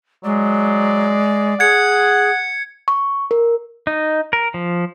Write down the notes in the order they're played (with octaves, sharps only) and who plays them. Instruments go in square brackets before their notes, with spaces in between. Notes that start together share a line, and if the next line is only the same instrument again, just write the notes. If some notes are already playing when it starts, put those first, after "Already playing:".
[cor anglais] F#3 [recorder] G#3 [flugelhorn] D5
[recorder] G#4 [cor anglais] F#5 [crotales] G#6 C#7
[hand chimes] C#6
A#4
[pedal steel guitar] D#4
A#4
F3